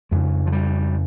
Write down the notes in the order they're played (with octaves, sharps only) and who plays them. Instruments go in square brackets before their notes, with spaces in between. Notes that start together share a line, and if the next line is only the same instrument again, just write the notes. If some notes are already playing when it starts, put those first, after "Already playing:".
[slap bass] F2 C#3 G#3
F3
G3